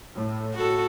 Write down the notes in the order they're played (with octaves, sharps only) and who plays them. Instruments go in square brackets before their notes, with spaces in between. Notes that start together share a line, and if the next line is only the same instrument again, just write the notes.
[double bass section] A2
[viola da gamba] F#4 A4